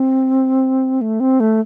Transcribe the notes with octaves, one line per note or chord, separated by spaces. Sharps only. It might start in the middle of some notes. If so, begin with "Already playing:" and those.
Already playing: C4
A3
C4
A3